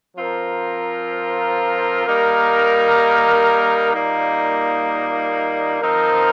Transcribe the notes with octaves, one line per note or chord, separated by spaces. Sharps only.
F3 C4 F4 A#4
G3 A#3 D#4 A#4
A#2 G3 A#3 D#4
F3 C4 D#4 A#4